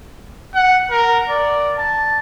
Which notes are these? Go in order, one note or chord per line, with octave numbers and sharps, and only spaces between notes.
F#5
A#4
D5
A5